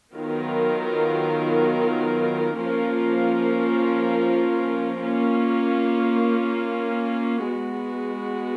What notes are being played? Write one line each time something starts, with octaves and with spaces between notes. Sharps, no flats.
D#3 F#3 B3 F4 A#4
F3 A#3 C#4 F4 A#4
A#3 C#4 F4
G#3 B3 F#4